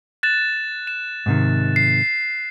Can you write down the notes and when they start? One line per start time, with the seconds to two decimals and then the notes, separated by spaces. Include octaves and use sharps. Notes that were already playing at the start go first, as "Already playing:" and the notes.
0.23 F#6 A6 E7
0.87 E7
1.26 G#2 C3 D#3
1.76 C7